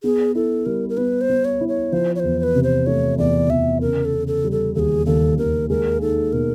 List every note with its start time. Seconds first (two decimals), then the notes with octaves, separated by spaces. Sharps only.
0.03 B3 G#4
0.35 E4 A4
0.66 G3 A#4
0.89 A#4
0.97 B3 B4
1.21 C5
1.29 B3
1.45 C#5
1.61 E4
1.68 C#5
1.92 F3 C5
2.15 C#5
2.20 E2 C5
2.39 C5
2.43 B4
2.55 C3
2.64 C5
2.86 A3 C#5
3.18 E2 D5
3.49 E2 E5
3.81 C#3 A#4
4.05 A4
4.13 C#3
4.27 A4
4.44 G3
4.52 A4
4.75 D#2 G#4 A4
5.06 D#2 A4
5.38 D#2 A#4
5.70 G#3 A#4
6.01 D#4 A4
6.33 B2 A#4